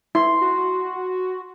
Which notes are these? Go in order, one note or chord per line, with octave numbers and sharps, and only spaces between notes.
E4 C6
F#4